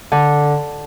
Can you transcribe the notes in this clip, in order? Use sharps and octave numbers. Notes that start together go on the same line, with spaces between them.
D3